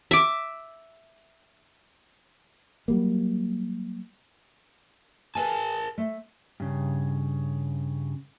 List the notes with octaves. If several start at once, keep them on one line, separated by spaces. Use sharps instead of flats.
E5 D6
F#3 G3 A#3
G#4 A#4 B4 F5 G#5 A5
A3
G2 C#3